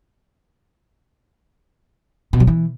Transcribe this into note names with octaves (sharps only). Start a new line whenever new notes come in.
B2
F#3
E3